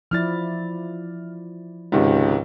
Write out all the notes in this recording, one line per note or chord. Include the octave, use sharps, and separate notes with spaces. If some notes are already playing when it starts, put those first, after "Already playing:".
F3 E4 D5 F6 A6
C#2 G#2 C3 D#3